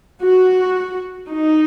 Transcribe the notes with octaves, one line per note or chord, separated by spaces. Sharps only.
F#4
D#4